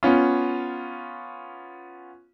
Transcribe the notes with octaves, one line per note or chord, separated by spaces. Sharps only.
B3 C#4 F4